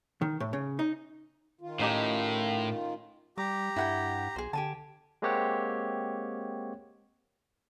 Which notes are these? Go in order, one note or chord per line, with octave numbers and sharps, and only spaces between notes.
D#3
A2
C#3
D#4
D#3 F4
A2 C#4 D#4 G4
G3 G4 A#5 D6
G2 E4 F#5 G5
B1 G#4 C5
D3 G4 G#5 A5
G#3 A#3 C4 G4 C#5 F#5